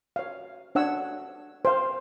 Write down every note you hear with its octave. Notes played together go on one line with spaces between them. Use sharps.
C#5 F5
D4 C#5 F#5 E6
C5 F5